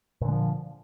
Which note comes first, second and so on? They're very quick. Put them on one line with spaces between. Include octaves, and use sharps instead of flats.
A#2 D3 G#3 F3